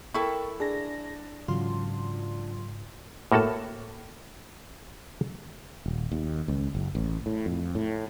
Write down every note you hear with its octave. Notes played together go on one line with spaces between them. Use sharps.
E4 A4 A#4 G5 C#6
D4 G#4 A#6
G#2 C#3 E3 F#3 F4 C6
A2 A#3 F#4 A4 A5
D#1
D#2
C#2
F#1
A1
A2
F2
A2